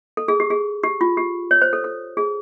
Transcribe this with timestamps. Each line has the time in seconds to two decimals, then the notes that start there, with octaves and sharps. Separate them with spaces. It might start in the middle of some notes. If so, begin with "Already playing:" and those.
0.17 A4
0.28 G#4
0.40 G4
0.50 G#4
0.83 G4
1.01 F4
1.17 G4
1.51 C#5
1.62 C5
1.73 A4
1.84 A4
2.17 G#4